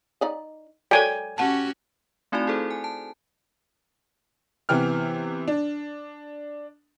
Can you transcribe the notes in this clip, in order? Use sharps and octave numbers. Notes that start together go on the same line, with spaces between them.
D#4 D5 D#5
F#3 G#3 A4 A#4 D5 G5 G#5
C#4 F#4 G4 F#5 A5
A3 C4 D#4 E4 F#4 D5
E4 G#4 A4 C5
G#5
A5
C3 E3 B3 G5 F6
D4